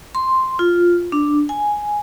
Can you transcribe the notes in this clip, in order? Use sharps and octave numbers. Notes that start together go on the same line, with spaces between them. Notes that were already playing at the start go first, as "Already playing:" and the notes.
C6
F4
D4
G#5